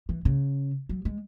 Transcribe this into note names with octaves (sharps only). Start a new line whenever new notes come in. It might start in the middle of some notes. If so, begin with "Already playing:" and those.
E3
C#3
F#3
G#3